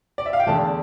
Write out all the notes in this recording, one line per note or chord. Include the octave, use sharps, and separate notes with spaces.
D5
E5
F5
G5
E2 D3 A3 D4 A5